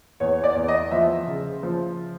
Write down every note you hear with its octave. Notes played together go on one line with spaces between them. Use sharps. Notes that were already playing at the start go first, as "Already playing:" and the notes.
E2 C#5
D5
E2
D#5
F3 E5
C#3
F3